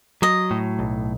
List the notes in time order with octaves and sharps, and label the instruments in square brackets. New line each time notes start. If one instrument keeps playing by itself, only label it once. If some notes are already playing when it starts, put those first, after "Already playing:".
[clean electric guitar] F#3 [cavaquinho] D#5
[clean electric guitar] A2
B1